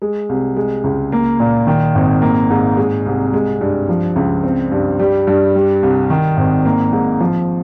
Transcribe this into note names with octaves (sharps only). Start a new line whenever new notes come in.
G#3
C2
G#3
C#2
A#3
A#2
D#3
G#1
A#3
G#2
G#3
C2
G#3
G2
F3
C#2
C4
G2
G3
G2
G3
C2
D#3
G#1
A#3
G#2
F3